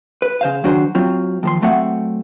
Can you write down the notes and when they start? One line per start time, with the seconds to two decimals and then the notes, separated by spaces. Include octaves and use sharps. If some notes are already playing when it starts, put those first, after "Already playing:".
0.22 B4
0.41 C#3 C5 F5
0.64 D#3 F#3 D4 F#4 G#4 C5
0.95 F#3 C4 F4
1.43 D#2 F3 C6
1.62 F#3 A3 C4 E5 F#5